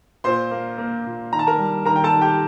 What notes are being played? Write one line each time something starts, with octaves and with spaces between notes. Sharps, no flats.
A#2 C5 C6
A#3
A#3
A#2
D#3 A#5
A5
A#4 A#5
G3
D#3 A#4 A#5
G5
A4 A5
D#3
G4 G5